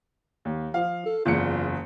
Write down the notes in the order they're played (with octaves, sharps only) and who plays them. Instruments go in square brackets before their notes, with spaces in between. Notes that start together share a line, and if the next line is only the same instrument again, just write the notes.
[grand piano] D#2
[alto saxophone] F3 [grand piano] F5
[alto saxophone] A4
[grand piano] F#1 E2 C#7 [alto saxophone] F4